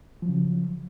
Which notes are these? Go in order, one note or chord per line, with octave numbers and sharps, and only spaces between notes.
C#3 F3 F#3